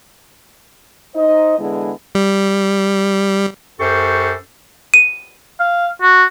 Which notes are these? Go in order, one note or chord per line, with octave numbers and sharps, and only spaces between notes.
D#4 C5 D#5
E2 D3 G#3 B3 E4 G#4
G3
F#2 G4 A4 C5 C#6
D#7
F5
F#4